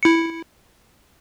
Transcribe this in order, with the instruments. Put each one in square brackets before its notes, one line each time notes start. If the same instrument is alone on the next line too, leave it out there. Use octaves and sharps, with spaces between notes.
[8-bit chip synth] E4 C#7